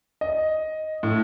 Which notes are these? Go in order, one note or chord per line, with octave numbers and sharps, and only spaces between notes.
D#5
A2